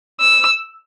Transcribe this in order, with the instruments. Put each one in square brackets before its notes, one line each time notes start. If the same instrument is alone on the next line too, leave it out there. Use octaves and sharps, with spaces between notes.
[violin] E6